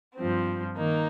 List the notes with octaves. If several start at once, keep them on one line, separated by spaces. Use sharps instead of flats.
G2 F3 C4
D#3 A#3 D#4